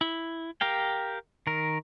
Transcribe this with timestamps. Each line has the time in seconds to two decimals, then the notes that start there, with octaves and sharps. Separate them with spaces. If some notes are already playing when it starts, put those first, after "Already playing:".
0.01 E4
0.61 G4 A#4 F5 G5
1.47 D#3 A#4